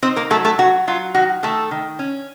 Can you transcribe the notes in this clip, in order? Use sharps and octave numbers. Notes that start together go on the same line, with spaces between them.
C4 D#4 C5
A#3 A#4
F#3 A3 A4
A3 A4
F#3 F#4
F#3 F4
D#3 F#4
D#3 A3 A4
D#3
C#4